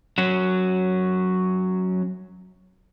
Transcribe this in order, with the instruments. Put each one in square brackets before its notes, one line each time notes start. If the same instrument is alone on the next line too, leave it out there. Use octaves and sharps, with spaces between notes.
[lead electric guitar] F#3 C#4